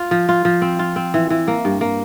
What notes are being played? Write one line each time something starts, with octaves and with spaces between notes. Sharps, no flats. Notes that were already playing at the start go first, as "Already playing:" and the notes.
Already playing: F4
F3
F4
F3
C4
F4
C4
E3
E3
A#3
G2
A#3